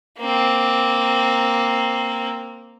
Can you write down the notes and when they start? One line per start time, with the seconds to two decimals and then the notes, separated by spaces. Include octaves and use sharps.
0.19 A#3 C4